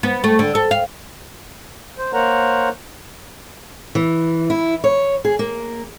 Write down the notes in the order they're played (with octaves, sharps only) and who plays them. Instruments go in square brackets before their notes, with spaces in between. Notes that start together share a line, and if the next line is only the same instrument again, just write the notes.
[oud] B3
A3
D3
A4
F5
[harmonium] C5
A#3 A#4 C5 C#5 F#5 A#5
[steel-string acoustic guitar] E3
E4
C#5
G#4
A#3